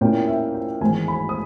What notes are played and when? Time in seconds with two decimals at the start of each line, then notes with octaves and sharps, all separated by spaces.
0.01 A#2 A#3 C#4 E4 G5
0.28 E5
0.54 G5
0.81 G#1 G#2 E3 G#3 G#5
1.08 B5
1.29 D#6